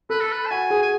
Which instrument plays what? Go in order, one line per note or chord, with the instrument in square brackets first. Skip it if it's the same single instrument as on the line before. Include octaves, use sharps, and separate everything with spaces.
[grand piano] A4 [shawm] B4
[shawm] A4
B4
A5
[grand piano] F#4 [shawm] G#5
[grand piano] G#4
[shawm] G#5